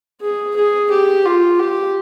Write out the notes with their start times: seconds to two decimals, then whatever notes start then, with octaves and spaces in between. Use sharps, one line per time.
0.21 G#4
0.56 G#4
0.91 G4
1.25 F4
1.59 G4